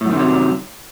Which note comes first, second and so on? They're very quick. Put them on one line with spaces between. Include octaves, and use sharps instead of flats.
A2 F#2 D#3 C3 F#3